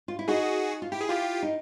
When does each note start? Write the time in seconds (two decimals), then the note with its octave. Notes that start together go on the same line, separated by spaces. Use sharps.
0.08 F4
0.19 E4
0.28 D#4 F#4 G#4
0.82 F4
0.92 E4 G4
1.01 G#4
1.09 F4 G4
1.43 D#4